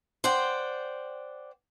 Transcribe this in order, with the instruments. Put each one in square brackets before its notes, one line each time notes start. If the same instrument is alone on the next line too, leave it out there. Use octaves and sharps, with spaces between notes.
[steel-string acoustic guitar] C5 D5 F#5 G5